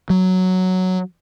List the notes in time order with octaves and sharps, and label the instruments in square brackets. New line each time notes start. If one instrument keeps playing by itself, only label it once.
[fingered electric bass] F#3